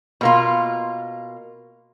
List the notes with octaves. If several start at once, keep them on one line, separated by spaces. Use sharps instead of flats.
B2 A#3 F4